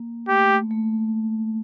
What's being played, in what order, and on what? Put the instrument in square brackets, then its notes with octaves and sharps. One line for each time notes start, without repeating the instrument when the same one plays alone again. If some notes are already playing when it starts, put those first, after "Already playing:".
Already playing: [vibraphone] A#3
[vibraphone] A3 [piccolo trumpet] G4
[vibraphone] A3
A3